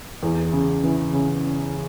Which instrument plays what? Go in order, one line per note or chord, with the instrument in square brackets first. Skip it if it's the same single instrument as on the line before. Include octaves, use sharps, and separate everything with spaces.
[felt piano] E2
C#3
E3
C#3